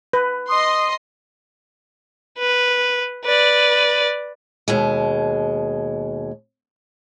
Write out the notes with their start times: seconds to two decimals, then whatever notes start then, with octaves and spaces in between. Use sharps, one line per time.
0.13 B4
0.49 D#5 C6 D#6
2.38 B4
3.25 B4 D5
4.68 D#2 B2 G#3